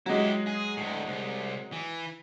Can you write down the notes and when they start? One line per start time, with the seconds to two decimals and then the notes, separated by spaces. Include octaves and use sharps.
0.06 F#3 G#3 E4 G4
0.47 G#4
0.77 D2 A2
1.06 C2
1.72 E3